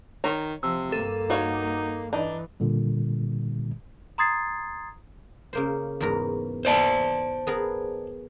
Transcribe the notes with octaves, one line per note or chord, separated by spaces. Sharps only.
D#3 C#5 A#5
C3 F3 E6
G2 A#3 A4
D#4 F#4 C#5 F5
E3 D4 D#4
A#2 D3 G3
A#5 C6 D#6 G#6 A6 C7
C#3 A#3 C5
E2 G#2 A#4
C5 D5 A5
B3 G#4 A#4